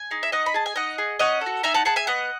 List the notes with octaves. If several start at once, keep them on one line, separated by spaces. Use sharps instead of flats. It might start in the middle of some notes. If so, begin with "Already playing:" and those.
Already playing: G#5
D#4 G#4
E5
D#4 D#5 F#5
B5
G#4 A5
G#5
D#4 D#5 F#5
G#4
C#4 D#5 F#5
A4
F#4
D#4 E5 G#5
F#5 A5
G#4 F#5 A5
E5 G#5
B3 D#5 F#5